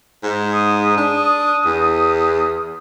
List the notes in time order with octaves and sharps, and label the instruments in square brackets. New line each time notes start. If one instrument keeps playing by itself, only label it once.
[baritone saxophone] G#2
[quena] D#6
[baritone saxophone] D4
E2